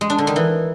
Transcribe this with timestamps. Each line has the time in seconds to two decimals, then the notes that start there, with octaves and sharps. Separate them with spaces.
0.01 G#3
0.10 D4
0.18 D3
0.27 D#3
0.36 E3